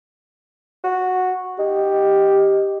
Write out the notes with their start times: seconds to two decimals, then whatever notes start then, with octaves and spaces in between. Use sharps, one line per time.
0.84 F#4
1.59 D#4 G4